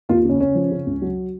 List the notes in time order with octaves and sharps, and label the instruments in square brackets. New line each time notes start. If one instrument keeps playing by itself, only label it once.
[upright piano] D#2 F4
C#3 C#4
C#3 C#4
F3
C#3
C#2
F#3